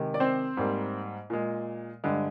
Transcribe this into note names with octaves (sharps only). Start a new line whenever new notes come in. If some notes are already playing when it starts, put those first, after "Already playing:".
Already playing: C3 D#3 G#3
D5
C4 C5
G#2 G3 A#3
A#2 G#3
G2 D3 G#3